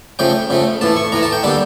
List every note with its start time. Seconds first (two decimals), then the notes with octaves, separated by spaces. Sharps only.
0.19 C#3 F3 A3 G5
0.50 C#3 F3 A3
0.81 A2 E3 A3 A5
0.96 C#6
1.12 A2 E3 A3 A#5
1.23 A5
1.33 G5
1.43 D3 G3 A#3 A4